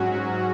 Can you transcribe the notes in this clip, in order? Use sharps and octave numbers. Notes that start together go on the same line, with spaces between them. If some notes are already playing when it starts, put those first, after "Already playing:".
Already playing: G#2 F#3 C#4 F#4